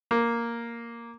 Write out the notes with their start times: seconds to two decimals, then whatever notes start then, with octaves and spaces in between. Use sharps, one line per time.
0.11 A#3